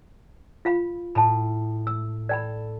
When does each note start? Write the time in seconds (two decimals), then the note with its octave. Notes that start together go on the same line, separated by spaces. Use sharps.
0.65 F4 F5 B5
1.15 A2 A5 B5
1.87 E6
2.29 A4 D5 G5 B5